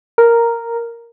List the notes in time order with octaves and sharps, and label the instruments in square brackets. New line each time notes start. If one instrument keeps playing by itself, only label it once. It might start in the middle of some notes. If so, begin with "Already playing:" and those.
[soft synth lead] A#4